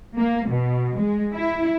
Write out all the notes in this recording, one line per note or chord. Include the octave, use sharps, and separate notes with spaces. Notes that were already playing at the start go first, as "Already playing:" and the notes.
A#3
B2
G#3
E4